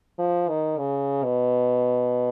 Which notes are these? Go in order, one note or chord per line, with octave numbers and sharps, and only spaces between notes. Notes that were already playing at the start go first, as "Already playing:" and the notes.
F3
D#3
C#3
B2